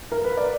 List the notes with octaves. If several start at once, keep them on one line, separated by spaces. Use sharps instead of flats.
A#4
B4
D5